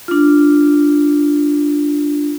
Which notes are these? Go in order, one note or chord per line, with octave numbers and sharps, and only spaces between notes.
D4 F4